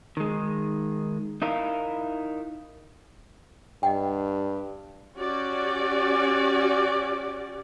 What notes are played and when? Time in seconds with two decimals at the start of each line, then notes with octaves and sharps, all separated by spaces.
0.17 D#3 G#3
1.42 D#4 E4 A#4 F5
3.83 G2 D#5 F#5 G5
5.18 C#4 F#4 G4 D5